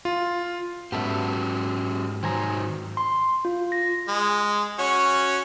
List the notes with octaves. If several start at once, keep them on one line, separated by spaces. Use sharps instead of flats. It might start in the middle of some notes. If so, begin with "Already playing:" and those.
F4
G#2 F#3 B3 C#4 G4 A4 E5
D#3 F#3 C4 G#5 A#5
C6
F4
A#6
G#3
C#4 F#4 C#5